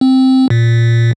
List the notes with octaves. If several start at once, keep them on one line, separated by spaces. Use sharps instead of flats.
C4
A#2